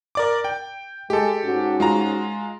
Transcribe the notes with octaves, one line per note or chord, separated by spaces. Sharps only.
A#4 D5 D6
G5
G#3 G4 A4
G#2 C#4 F#4
G#3 F4 A#5